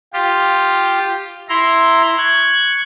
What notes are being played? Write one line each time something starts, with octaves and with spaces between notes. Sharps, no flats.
F4 G4
E4 A#5 C6
C#6 F#6 G#6